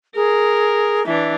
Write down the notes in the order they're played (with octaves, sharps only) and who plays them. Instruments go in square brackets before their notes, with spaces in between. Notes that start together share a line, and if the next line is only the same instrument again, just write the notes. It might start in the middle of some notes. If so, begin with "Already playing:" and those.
[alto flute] G#4 [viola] A#4
[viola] E3 D4 [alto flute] E5